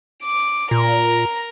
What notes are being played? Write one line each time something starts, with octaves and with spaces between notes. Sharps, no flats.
D6
A#2 A#4 A#5